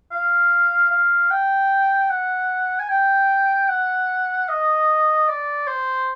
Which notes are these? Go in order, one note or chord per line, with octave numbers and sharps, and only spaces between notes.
F5
F5
G5
F#5
G#5
G5
F#5
D#5
D5
C5